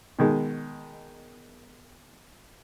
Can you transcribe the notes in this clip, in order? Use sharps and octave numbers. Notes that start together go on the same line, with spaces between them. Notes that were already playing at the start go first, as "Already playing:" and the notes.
B2 D#3 G#3